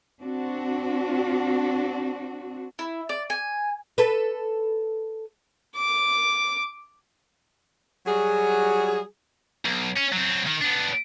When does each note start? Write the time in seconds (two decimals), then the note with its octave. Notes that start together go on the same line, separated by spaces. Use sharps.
0.20 C4 D4 F#4
2.79 E4
3.09 D5
3.30 G#5
3.98 A4 B4
5.77 D6
8.06 F#3 G3 F#4 G#4
9.65 B1
9.97 C#4
10.13 F#3 C4
10.47 D#3
10.61 B3 D4